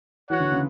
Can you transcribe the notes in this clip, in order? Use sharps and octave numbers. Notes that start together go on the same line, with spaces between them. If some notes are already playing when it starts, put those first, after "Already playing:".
E3 F#4 C#5 F#5
D3
C#3